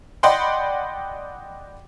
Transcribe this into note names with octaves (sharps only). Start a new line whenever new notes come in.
D5 D#5 F#5 G5 B5 C6